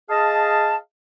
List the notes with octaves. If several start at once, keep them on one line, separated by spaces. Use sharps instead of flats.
G#4 D#5 F5 A5